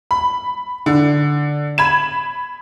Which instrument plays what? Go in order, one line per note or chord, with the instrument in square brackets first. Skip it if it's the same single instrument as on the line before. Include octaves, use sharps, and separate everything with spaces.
[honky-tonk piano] B5
D3
B5 G#6 E7